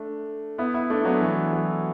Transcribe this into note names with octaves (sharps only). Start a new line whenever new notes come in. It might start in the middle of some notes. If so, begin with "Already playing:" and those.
Already playing: A3 D4
B3 E4
B3 E4
A3 D4
D4
F#3 B3
E3 A3
F#3